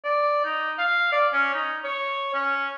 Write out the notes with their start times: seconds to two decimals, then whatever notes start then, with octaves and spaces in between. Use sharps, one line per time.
0.04 D5
0.45 D#4
0.79 F5
1.12 D5
1.33 C#4
1.54 D#4
1.84 C#5
2.34 C#4